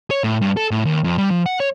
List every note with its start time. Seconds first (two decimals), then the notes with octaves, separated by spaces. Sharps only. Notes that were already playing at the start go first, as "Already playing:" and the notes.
0.11 C#5
0.24 A2
0.42 G2
0.57 A4
0.71 A2
0.86 D#2
1.04 F2
1.18 G3
1.31 F3
1.46 F#5
1.60 C#5